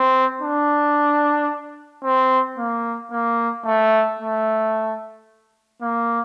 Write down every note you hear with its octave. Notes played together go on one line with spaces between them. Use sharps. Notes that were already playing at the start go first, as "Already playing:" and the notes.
Already playing: C4
D4
C4
A#3
A#3
A3
A3
A#3